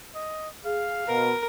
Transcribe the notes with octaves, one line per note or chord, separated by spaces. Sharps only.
D#5
G#4 F5
B2 A#4